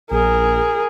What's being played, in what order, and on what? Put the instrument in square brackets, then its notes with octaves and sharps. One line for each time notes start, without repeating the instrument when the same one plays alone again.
[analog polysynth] A#1 [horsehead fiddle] G#4 A#4